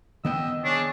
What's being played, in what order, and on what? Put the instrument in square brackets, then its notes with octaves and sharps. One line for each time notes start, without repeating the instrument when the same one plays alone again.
[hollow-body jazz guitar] D#3 B3 G5 [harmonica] D#5 E6
[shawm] D4 [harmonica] G#4 C#5